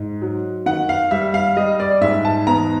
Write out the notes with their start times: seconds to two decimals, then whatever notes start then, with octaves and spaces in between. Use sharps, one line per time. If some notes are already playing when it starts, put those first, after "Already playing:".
Already playing: G#2
0.22 F#3
0.66 D#3 F#5
0.89 F5
1.11 G3 E5
1.34 F5
1.56 G3 D#5
1.80 D5
2.01 G#2 E5
2.25 A5
2.47 E2 A#5